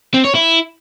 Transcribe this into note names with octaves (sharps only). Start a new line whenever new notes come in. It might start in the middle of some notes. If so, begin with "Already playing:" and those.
C4
C#5
E4